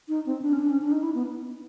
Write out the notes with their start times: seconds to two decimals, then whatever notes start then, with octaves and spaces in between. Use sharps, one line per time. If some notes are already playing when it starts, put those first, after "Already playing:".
0.09 D#4
0.26 C4
0.42 D4
0.53 C#4
0.59 D4
0.70 C#4
0.81 D4
0.92 D#4
1.03 E4
1.14 B3